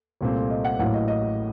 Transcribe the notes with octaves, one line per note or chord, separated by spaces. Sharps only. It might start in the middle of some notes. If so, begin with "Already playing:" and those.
C2 A#2 A3 C4
D#5
F#5
A1 A2 F#3 A#3 F#5
D#5
D#5